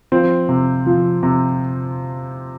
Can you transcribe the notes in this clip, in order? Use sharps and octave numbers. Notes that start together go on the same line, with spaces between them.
F3 C4
C3
F3
C3